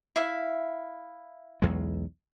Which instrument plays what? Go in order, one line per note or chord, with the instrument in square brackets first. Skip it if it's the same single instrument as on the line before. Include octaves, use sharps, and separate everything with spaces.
[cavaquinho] E4 E5 F5
[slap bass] B1 E2 G#3